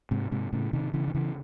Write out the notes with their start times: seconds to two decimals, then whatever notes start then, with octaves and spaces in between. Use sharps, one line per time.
0.11 G#2 C3
0.32 G#2 C3
0.53 A2 C#3
0.73 C3 D#3
0.93 C#3 E3
1.08 D#3
1.15 C#3 E3